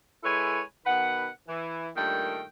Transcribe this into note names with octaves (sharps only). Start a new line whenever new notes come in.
G#3 E4 A4 B4 C#5 G#5
B2 D#3 B4 F#5
E3
G2 A#2 D#3 A3 G5